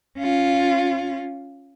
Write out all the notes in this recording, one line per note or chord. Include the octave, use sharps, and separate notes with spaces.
C#4 F4